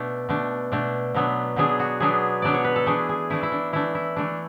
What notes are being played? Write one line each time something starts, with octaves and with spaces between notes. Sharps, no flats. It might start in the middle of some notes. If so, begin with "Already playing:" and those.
Already playing: B2 A3 D4
B2 A3 D4
B2 A3 D4
B2 F#3 B3 D4
B2 F#3 B3 D4 G#4
F#4
B2 F#3 B3 D4 G#4
B2 F#3 B3 D4 D5
C#5
B4
A4
E3 A3 D4 G#4
G#4
E3 A3 D4 E4
E4
D4
E3 A3 D4 E4
E4
E3 A3 D4